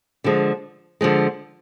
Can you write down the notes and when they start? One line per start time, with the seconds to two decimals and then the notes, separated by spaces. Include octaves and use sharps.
0.24 D3 F3 G#3
1.01 D3 F3 G#3